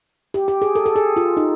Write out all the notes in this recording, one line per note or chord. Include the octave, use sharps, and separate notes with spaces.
G4
G4
G#4
A4
A4
G#4
F4
D#4